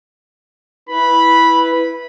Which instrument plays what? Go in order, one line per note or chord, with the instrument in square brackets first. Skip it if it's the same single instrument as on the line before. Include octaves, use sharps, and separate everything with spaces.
[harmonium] E4 B4 [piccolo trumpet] B5